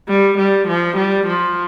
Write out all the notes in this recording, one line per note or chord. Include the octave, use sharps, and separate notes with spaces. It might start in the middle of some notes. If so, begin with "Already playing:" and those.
G3
G3
F3
G3
F3